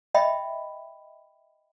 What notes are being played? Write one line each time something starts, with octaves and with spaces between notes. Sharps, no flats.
D#5 E5 G5 B5